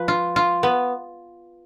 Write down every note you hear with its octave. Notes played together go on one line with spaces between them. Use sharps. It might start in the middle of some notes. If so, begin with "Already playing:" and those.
Already playing: F3 B4
F4
F4
B3